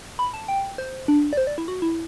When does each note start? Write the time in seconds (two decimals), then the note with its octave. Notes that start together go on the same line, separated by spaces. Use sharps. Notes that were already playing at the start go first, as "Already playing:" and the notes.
0.19 B5
0.34 A5
0.48 G5
0.78 C5
1.08 D4
1.33 D5
1.37 C5
1.47 D5
1.58 E4
1.68 F#4
1.82 E4